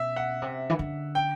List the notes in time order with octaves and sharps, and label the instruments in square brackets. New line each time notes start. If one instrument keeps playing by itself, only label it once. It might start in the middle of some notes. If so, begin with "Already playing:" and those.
Already playing: [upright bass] B2 [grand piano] E5
[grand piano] F#5
[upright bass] C3
E3
D3
[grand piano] G5